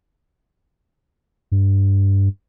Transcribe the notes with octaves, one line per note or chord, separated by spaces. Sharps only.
G2